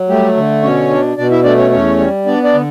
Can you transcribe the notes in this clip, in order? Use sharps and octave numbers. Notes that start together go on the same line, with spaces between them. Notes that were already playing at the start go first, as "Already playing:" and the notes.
Already playing: F#3
G3 A3 G4
D3
B2 C#4 C#5
D4
B2 D4 D5
E4 E5
A3 D4 D5
C#4 C#5
E2 C#4 C#5
G3
B3 D4 D5
D4 D5
D3